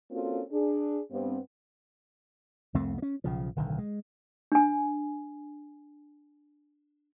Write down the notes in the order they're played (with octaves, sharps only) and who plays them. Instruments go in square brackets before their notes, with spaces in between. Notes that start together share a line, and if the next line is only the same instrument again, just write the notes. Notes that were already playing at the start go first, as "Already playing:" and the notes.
[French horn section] A#3 C4 C#4 F4 F#4 A4
D4 G#4
G2 B3 C4
[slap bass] C2 F2 A3 C4
A#3 C#4
B1 C#3 F3
D1 B1 D3 D#3
G#3
[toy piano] D4 G#5